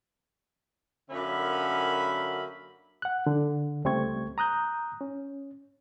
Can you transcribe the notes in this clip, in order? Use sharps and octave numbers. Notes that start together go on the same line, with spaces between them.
F#2 D3 A#3 C#4 E5 B5
F#5 F#6
D3
C#2 G3 A3 C4 C#6 G#6
A#5 D#6 F#6 G6
C#4